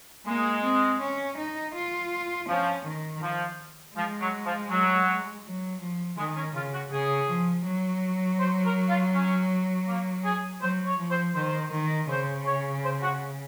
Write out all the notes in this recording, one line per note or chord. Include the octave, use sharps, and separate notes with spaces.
G#3 A#3
C4
C#4
D#4
F4
F3 C#4
D#3
F3
F3 G#3
F#3
F3
F#3
F#3
F3
D#3 G#3
C#4
C#3 F4
F#4
C#3 G#4
F3
F#3
C5
A#4
F4
C#4
A#3
G#4
F#3 C5
C#5
F3
C5
D#3 C5
D#3
C#3 C5
C#5
C5
F#4